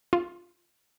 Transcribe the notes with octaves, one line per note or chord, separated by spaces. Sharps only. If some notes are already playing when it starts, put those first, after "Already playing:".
F4